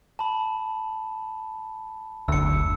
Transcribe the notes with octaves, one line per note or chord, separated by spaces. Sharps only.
A5 B5
F#1 D2 E6 C#7